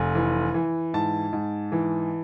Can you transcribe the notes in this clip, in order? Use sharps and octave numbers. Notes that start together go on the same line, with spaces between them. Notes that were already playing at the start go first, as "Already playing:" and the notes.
Already playing: F1 G#5
E3
E3
G#2 A5
G#2
E3